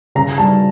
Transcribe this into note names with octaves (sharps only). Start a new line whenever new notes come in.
C#3 A#5
G3 A5